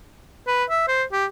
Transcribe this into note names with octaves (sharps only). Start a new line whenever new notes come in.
B4
E5
C5
G4